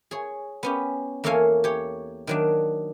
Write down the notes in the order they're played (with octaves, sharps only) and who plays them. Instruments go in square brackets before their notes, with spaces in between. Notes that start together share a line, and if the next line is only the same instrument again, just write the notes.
[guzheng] G#4 C#5
B3 C#4 G4
E2 A#3 A4 C#5 F5 G#5
G4 C#5
D#3 F#3 D4